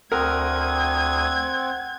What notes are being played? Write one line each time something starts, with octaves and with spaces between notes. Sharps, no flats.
D2 C4 A#4 F#5 D#6 G#6